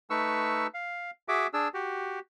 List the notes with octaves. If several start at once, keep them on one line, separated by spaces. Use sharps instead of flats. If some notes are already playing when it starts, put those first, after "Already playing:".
A3 D#4 B4 C#6 E6
F5
F#4 G#4 E5 D6
D4 G#4 E6
F#4 G4